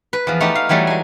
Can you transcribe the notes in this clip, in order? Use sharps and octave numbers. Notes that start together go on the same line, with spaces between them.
B4
E2 F3
A3 D#4 G4
F5
E3 F#3 G3 A3 D#4
G#3 G#5